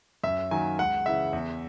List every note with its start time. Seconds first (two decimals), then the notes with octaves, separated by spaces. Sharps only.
0.24 F#2 E5
0.51 D#3 F#3 A#3 G#5
0.79 C#2 F#5
1.06 C#3 E3 E5
1.33 E2